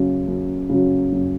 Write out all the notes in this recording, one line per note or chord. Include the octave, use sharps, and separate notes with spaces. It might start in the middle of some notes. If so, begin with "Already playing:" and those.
Already playing: F#2 C#3 F#3
F#2
C#3 F#3
F#2